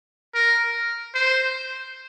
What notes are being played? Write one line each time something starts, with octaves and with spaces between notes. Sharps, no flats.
A#4
C5